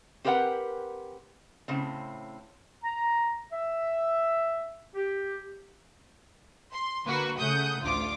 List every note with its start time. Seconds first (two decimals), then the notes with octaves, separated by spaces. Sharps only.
0.24 C4 G4 A#4 B4 E5 F#5
1.68 A2 C#3 C4
2.84 A#5
3.53 E5
4.95 G4
6.73 C6
7.06 D3 A#3 F#4 B4
7.39 C#3 A3 F#5 D#6 G6
7.81 A1 D2 F4 D6